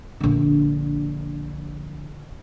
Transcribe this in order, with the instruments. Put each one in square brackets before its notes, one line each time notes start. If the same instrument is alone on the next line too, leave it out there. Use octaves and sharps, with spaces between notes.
[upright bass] A#1 D3